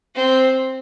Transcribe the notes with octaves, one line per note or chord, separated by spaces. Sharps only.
C4